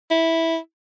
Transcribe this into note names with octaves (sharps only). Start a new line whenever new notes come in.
E4